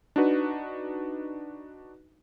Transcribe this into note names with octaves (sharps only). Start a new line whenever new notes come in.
D4 D#4 F#4 B4